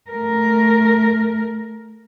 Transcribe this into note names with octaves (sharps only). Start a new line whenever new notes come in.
A3 A#4